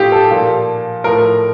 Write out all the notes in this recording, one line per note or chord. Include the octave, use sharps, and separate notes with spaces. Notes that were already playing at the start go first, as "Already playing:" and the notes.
Already playing: A2 A3 D#4 F4 G4
A4
A#2 F3 A#3
A2 F3 A3 A#4